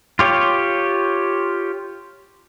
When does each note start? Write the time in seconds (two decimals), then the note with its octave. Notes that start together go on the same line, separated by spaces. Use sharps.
0.19 F4 G4 C#5